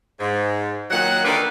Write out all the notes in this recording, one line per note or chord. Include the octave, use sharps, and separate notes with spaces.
G#2
A#2 D#3 F#3 F#5
D3 D#3 A#3 A4 B4 D5